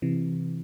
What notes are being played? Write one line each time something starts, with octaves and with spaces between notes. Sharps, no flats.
C3 E3